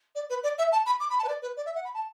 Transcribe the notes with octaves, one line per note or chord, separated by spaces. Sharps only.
D5
B4
D5
E5
A5
B5
D6
B5
A5
B4
D5
B4
D5
E5
F#5
B5
A5